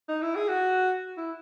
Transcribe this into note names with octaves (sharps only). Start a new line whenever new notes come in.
D#4
E4
G#4
F#4
E4